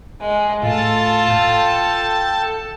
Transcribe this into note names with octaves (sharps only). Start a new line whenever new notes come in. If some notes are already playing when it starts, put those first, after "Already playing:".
G#3
A2 F4 A4 A5
G5